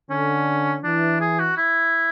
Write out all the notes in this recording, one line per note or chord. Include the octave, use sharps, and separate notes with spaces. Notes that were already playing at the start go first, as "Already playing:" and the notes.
D3 C#4
E3 D4
G#4
F#4
E4